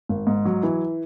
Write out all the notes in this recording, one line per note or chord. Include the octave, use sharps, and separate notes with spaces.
G#1
G#2
F#3
E3